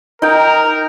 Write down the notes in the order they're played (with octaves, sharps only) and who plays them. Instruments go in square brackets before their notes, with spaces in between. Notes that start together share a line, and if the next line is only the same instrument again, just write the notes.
[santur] D#4 G5 [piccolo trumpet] A#4